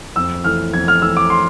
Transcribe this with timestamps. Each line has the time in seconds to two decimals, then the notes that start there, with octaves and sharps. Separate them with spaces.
0.16 F2 E6
0.44 E3 A3 F6
0.73 F2 G#6
0.88 F6
1.02 E3 A3 E6
1.17 D6
1.30 C6